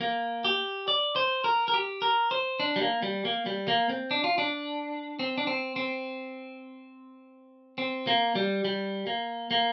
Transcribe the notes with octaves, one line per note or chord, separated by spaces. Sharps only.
A#3
G4
D5
C5
A#4
A#4
G4
A#4
C5
D4
G3
A#3
G3
A#3
G3
A#3
C4
D4
F4
D4
C4
D4
C4
C4
C4
A#3
G3
G3
A#3
A#3